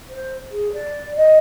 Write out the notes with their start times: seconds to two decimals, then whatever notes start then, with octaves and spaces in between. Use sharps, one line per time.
0.10 C5
0.51 G#4
0.73 D5
1.16 D#5